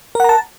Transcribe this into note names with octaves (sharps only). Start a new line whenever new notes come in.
A#4 F#5 A5 A#5